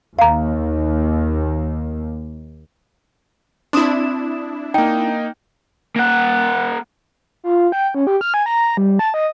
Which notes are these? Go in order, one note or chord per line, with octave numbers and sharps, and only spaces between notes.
D#2 F5 A#5
C4 D4 E4 D#6 E7
A#3 D#4 G5
A#3 F#5
F4
G5
C#4
G4
F6
G#5
A#5
G3
A5
D#5